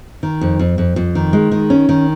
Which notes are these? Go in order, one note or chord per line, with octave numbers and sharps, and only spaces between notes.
D#3
F2
F2
F2
F2
D#3
G#3
D#3
C#4
D#3